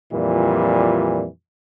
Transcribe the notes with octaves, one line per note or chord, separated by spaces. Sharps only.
F2 A#2 E3 G3